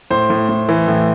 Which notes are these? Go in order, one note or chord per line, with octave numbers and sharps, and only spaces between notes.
A2 C5
A2
A2
E3
A2